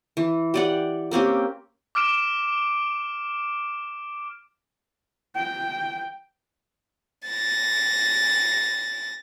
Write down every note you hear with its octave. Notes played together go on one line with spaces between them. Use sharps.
E3
G4 D5 F#5
A#3 C4 C#4 G4
D6 F6 D7 E7
G5
A6 A#6